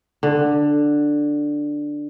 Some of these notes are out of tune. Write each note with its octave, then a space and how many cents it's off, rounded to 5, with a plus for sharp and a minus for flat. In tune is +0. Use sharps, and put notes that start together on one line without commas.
D3 +5